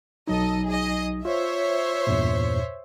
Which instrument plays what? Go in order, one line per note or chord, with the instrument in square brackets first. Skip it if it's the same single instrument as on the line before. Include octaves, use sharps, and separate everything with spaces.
[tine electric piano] B1 F#3 D#4 [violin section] A4 D#5
[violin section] G#4 D#5
[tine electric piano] F4 [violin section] C5 C#5 E5
[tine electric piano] E2 G2 A#2